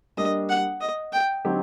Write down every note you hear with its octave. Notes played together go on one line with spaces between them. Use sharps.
G3 A#3 D4 D#5
F#5
D#5
G5
D3 F#3 C4 D#4 G4